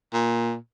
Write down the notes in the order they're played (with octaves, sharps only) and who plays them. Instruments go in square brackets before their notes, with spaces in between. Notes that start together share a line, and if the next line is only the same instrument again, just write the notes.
[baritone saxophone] A#2